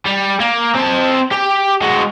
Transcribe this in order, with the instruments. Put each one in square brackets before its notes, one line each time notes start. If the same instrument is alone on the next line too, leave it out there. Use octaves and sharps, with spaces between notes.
[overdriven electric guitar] G3
A#3
C4 A5
G4
G#3 F#4